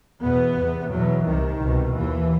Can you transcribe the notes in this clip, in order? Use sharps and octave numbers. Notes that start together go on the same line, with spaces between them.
E2 B2 B3
E2 C3
E2 B2 F#3
C2 C3 D#3
C2 B2
D#2 E3